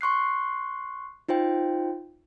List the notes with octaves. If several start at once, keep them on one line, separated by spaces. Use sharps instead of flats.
C6 C#6 F#6 C7
D#4 F4 C5 G5